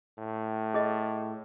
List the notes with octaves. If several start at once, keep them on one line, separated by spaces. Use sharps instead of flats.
A2
G#4 D#5